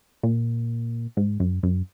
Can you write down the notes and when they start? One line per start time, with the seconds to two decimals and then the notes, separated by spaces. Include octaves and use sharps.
0.23 A#2
1.17 G#2
1.40 F#2
1.63 F#2